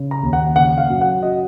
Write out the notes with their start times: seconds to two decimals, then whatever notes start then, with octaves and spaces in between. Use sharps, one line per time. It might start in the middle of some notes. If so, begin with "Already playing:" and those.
Already playing: C#3
0.11 A#5
0.23 D#2
0.33 F#5
0.56 C#3 F#5
0.78 F5
0.90 F#2
1.01 F#5
1.23 F#3 D#5